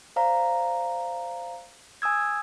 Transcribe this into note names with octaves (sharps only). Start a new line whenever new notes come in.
C5 D5 F5 A#5
G#5 D#6 E6 G#6